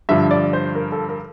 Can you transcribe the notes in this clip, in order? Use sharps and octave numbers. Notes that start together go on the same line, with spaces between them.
G2 D3 F3 E5
D5
C5
A#4
A4
A#4